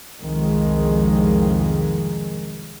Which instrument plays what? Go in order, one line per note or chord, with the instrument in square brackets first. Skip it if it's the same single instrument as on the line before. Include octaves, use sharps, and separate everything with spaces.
[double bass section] C2 F2 D#3 G#3